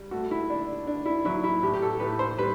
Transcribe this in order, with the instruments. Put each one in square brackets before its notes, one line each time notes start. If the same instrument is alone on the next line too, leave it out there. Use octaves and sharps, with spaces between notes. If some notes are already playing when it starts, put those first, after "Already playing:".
Already playing: [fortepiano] G3
A3 F#4
E4
D3 D4
D3 D4
E4
F#3 E4
E4
A2 G4
G4
A4
A2 B4
C5
G3 B4